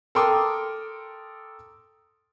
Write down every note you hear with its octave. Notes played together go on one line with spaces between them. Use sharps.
A4 A#4 G5 C6 D6 D#6